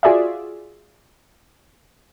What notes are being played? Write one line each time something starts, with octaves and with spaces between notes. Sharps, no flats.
F4 F#4 G#4 D5 E5